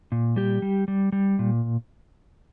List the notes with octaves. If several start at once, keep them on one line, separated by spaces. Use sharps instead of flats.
A#2
G3 G4
G3
G3
G3
A#2